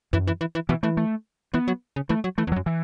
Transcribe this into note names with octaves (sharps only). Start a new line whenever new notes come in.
F#2 E3
E3
E3
E3
B2 E3
E3 A3
A3
E3 B3
F#3
C#3
E3 A3
F#3
E3 A3
E2
F#3
F#2
E3